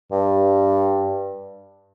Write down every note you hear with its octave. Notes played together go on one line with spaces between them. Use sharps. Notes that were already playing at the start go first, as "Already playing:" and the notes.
G2